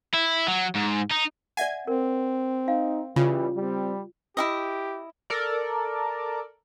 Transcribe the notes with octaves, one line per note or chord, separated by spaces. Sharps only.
E4
F#3
G#2
D#4
D5 E5 F#5 G#5 G#6
C4 A#4
D#4 F5
C#3 E3 G3 F4
G3 C4
E4 F#4 G4 D#5
A4 A#4 D5